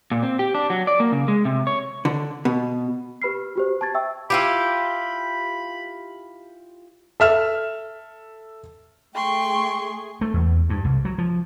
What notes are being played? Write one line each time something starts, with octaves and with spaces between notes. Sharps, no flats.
A#2
C4
G4
D4
F#3
D5
A#3
C#3
G#3
C3
C#5
D3
B2
G4 B4 B5 F6 C7
F#4 G4 C5
A5 C#6 G#6 A6
E5 G5 C#6 E6
E4 F4 G4 B5
A4 E5 F6 E7
A3 G#4 G5 C6 C#6
A3
E2
G2
C2
F#3
F3